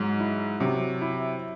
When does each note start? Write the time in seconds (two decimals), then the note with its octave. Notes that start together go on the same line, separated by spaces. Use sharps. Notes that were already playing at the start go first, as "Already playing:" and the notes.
Already playing: G#2 F#3
0.20 E4
0.60 C3 F#3
1.02 E4